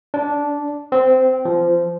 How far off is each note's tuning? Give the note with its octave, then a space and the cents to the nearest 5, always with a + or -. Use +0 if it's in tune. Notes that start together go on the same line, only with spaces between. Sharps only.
D4 -10
C4 -15
F3 -20